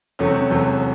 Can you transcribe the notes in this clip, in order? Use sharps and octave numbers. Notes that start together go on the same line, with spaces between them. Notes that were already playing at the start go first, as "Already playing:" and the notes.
E1 E2 C3 F#3 A3 C#4
C4
C#4
E1 E2 C3 F#3 A3